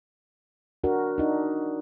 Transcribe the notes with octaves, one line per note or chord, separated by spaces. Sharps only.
D4 F#4 A#4
D4 D#4